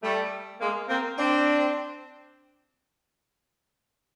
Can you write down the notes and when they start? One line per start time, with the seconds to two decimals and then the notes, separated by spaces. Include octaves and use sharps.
0.03 G3 A3
0.60 G#3 A#3
0.89 A#3 C4
1.17 C4 D4